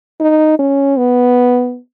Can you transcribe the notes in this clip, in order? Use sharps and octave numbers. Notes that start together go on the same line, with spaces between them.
D#4
C#4
B3